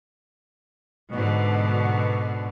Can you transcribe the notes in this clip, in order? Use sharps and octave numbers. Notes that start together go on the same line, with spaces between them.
G#2 B2 D3